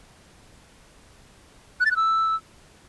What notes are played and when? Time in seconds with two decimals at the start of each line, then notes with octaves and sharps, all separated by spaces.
1.80 F#6
1.86 A6
1.91 F#6
1.96 E6